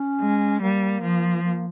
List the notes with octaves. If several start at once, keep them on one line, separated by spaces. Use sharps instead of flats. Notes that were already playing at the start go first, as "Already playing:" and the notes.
Already playing: C#4
G#3
G3 A#3
F3
A#3